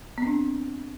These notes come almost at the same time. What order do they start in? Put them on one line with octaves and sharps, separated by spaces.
B3 C4 D4